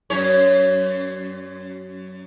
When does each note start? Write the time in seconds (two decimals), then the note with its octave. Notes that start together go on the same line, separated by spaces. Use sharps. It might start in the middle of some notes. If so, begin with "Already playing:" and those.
0.10 F#2 C#4 C#5